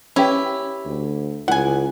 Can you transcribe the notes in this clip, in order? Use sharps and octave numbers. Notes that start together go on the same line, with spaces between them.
C#4 E4 G4 B4
D2
C#2 E4 F#5 G#5